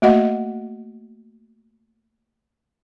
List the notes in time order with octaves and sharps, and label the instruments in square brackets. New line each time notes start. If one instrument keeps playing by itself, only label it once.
[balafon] A3 A#3 F#4 D#5 F#5